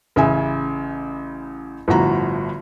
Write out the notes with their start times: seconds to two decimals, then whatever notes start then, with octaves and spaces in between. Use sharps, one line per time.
0.16 A1 C#3 E5 G#5
1.88 G1 A2 F3 F#4 A#5